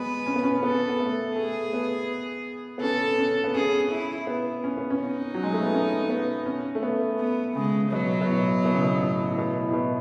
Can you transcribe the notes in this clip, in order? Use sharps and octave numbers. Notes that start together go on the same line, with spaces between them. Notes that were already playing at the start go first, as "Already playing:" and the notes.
Already playing: G#3 B3 B4
C#4
B3
C#4
C#4
B3 A4
B3
A3
A3 G#4
B3
B3
C#4 A4
C#4
B3
C#4 G#4
E4
B3
C#4
B3
C#4
D#4
F#3
G#3
A3
B3
C#4
B3
C#4
A3
B3
B3
C#3 G#3
B2 F#3
B2
A2
B2
C#3
B2
A2
A2
B2
A2
B2